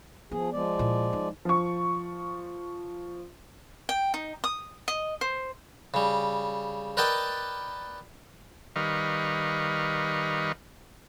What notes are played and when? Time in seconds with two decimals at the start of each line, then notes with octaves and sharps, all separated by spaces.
0.31 F3 B3 G#4
0.53 F3 G#3 D5
0.79 A#2 E4
1.13 D#4
1.45 F3 C#6
3.89 G5
4.14 D#4
4.44 D#6
4.88 D#5
5.21 C5
5.94 C#3 G3
6.97 A#4 B4 D5 D#5 G5 A5
8.76 D#3 G3 B4 D#5 F5 C#6